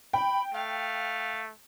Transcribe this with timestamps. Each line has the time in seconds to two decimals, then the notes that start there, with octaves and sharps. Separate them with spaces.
0.13 G5 B5
0.54 A3 F5